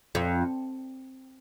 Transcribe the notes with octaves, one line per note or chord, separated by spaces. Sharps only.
F2